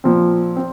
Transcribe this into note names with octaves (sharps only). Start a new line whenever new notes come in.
A#2 F3 C4
C4